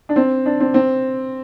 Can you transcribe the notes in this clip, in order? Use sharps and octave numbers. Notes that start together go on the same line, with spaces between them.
D4
C4
D4
C4
C4